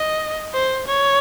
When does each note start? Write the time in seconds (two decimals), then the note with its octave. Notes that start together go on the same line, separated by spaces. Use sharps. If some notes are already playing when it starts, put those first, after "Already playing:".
Already playing: D#5
0.53 C5
0.87 C#5